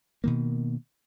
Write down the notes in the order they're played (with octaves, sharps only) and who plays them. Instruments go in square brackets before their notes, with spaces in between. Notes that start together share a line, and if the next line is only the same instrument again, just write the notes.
[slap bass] B2 D#3 A#3